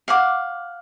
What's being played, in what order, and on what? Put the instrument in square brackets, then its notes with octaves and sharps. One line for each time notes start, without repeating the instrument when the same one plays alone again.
[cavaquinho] F5 F#5 D6